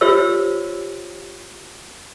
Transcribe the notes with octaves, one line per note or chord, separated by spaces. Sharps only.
F4 G4 C5 C#5 E6